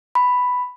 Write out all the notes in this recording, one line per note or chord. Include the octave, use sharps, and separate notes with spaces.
B5